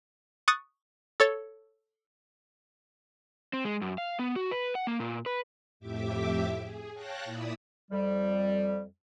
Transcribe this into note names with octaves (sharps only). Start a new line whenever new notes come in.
C#6 D#6 F#6 A6
A4 C#5 A6
C4
G#3
F#2
F5
B3
F#4
B4
F#5
A#3
A#2
B4
F2 A2 G4 E5 D6
G#4
C#5 F5 G5 A5 F#6 A#6
A#2 E4 D5 B5 D#6 E6
F2 G3